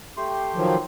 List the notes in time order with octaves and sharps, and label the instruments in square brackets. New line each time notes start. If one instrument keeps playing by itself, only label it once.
[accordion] A3 G4 C6
[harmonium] D#3 F3 F#3